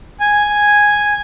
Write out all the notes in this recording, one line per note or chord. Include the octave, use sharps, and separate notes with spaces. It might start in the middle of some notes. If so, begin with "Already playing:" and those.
G#5